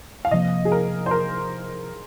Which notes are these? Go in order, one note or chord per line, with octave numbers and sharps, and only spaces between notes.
F5
C3 F3 A#3 D#5
G#4
A#4
C5
A#4